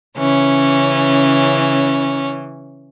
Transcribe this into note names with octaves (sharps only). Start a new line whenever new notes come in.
C#3 E3 C#4